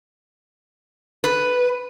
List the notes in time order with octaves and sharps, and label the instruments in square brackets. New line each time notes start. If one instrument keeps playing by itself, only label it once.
[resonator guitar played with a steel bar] B4